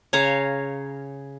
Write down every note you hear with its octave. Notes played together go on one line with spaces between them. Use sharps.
C#3 C#5 F5 A#5